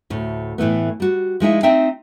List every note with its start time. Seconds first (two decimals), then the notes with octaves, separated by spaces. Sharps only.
0.10 D2 A2
0.58 A2 E3 A3 B3
1.00 G3 F#4
1.40 F3 G#3 D#4 E4
1.63 C4 D#4 E5 G5